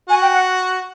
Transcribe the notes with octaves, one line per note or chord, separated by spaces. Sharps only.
F#4 G#5
G5
F#5